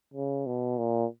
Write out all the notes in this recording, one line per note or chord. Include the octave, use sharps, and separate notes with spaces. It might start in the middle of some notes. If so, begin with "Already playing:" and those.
C#3
B2
A#2